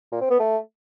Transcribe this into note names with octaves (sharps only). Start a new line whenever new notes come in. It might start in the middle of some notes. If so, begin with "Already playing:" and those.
A#2
C4
B3
A3